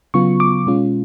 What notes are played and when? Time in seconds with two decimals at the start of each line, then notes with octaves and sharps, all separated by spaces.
0.14 C#3 F#3 B3 F4 C#6
0.40 D6
0.67 B2 G#3 C#4 F4